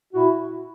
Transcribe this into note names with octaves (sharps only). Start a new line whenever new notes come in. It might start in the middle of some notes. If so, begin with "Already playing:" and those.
A#2 E4 F#4